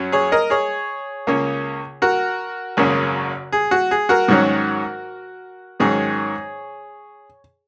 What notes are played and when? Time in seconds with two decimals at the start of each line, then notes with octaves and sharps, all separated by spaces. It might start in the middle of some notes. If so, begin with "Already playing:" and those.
Already playing: F#2 F#3 C#4
0.12 G#4 C#5
0.32 A#4 D#5
0.50 G#4 C#5
1.27 C#2 C#3 A#3 C#4
2.02 F#4 A#4
2.77 G#1 F#2 C#3 A#3 C#4
3.52 G#4
3.71 F#4
3.91 G#4
4.09 F#4 A#4
4.28 G#2 D#3 F#3 C#4
5.80 G#2 D#3 F#3 C#4 G#4 C#5